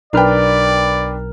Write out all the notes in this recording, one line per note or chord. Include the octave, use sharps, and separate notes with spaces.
B1 D4 A#4 B4 D5 G5 F6